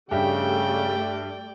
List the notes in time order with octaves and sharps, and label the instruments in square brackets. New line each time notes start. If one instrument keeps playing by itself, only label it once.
[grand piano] G2 G4 E5 [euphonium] C#3 [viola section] G3 A3 D5 [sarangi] G5